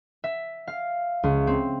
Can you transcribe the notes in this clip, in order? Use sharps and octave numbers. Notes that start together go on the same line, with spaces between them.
E5
F5
C#2
C4